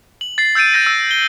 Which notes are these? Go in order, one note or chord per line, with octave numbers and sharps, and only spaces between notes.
F#7
A6 C7
E6 G6 A6 D7 D#7
G6 A#6 D#7
E6
G7